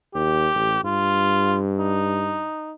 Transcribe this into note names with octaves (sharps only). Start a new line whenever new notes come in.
D#2 G4
A1
G2 F4
D#4